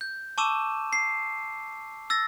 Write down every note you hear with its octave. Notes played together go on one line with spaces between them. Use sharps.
G6
A5 C#6 D6 E6 D#7 E7
C7
E6 A6 A#6